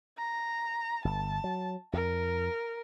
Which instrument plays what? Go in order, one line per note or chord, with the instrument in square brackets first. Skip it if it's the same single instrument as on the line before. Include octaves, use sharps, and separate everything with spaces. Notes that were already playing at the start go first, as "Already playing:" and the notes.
[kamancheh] A#5
[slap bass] G1 [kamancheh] A5
[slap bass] F#3
[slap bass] F2 [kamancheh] A#4